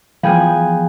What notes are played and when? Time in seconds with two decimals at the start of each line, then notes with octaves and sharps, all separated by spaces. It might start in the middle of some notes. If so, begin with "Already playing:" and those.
0.23 E3 F3 B3 G#4 F5 G5 G#5 G6